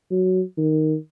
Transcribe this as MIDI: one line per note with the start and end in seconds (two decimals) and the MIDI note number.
0.11 0.41 54
0.57 0.96 51